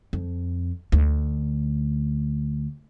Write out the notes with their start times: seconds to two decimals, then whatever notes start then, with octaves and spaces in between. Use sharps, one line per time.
0.13 F2
0.92 D2